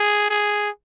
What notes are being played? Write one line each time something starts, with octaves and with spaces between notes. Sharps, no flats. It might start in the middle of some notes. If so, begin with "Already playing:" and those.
Already playing: G#4
G#4